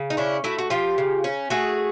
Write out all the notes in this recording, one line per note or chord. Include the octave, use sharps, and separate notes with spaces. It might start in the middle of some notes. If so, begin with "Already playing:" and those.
Already playing: C#3
D#4
C#4 D4 E4
A3 E4 F#4
F#4
F3 F4 G4
C#3
C#4
A3 F#4 G#4